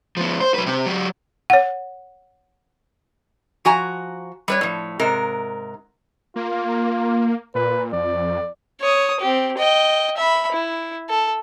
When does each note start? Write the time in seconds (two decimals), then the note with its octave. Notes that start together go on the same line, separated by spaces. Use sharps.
0.17 F3 B3
0.40 C5
0.54 F#3 B4
0.66 C3 C4
0.86 F#3 G4
1.50 C#5 F#5
3.65 F3 F#4 G#5 A#5
4.48 G3 B4 C#5
4.61 A2 F3
4.99 G#2 C3 A#4
6.36 A#3 F4
7.55 A#2 B4
7.93 F2 D5
8.81 C#5 D#6
9.20 C4 G4
9.57 D#5 G5
10.17 E5 B5
10.52 E4
11.09 A4